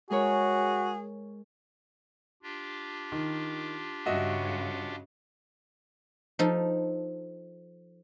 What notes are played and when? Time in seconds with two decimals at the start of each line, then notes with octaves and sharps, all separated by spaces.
0.10 G#3 F#4 G#4 A#4 C#5
2.43 D4 F4 G4
3.12 D#3
4.06 G2 C#3 F#4 D#5 E5
6.39 F3 D#4 A4